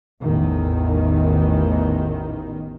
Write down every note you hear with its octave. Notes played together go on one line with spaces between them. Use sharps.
A1 E2 D#3